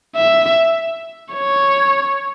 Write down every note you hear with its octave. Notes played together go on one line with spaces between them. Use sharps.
E5
C#5